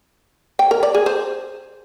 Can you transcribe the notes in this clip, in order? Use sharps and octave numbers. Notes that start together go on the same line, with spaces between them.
G5
A#4
D5
G#4
C5